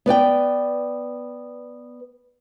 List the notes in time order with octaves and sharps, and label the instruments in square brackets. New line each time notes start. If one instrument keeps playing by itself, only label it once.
[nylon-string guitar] B3 B4 D5 G5